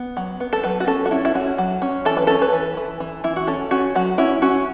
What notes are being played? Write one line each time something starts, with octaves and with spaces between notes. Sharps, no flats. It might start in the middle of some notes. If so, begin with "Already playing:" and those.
Already playing: B3
F#3
B3
A4
F#3 B4
F#4
C#4 A4
F#4
C#4 E4
E4
C#4 F#4
F#3
C#4
E3 A4
B4
C#4 A4
B4
E3
E3
E3
E3 E4
F#4
C#4 A4
C#4 F#4
F#3 F#4
C#4 E4
C#4 F#4